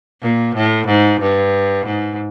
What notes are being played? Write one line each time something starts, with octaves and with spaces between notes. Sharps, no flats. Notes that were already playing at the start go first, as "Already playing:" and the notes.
A#2
A2
G#2
G2
G#2